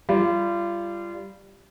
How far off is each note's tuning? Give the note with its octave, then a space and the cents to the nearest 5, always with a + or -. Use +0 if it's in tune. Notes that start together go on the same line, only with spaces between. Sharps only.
G3 +0 F4 -30